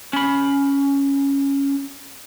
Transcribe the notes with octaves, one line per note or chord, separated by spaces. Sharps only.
C#4 B5